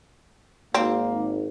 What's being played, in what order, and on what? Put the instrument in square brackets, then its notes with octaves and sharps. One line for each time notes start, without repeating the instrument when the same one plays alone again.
[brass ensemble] G#1 [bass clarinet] A#3 [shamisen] C4